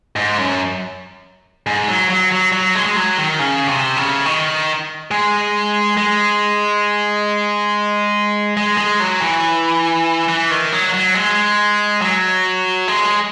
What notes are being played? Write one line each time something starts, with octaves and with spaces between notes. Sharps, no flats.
G#2
F#2
G#2
F#3
F#3
F#3
F#3
G#3
G#3
F#3
D#3
C#3
C3
C#3
D#3
G#3
G#3
G#3
G#3
F#3
E3
E3
D#3
F#3
F#3
G#3
F#3
G#3